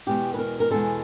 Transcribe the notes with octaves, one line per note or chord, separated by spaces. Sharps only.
E2 B2 G#3 G4
B4
A#4
A#4
E2 B2 G#3 A4